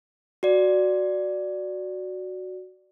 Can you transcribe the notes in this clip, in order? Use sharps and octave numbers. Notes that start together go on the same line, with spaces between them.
F#4 D5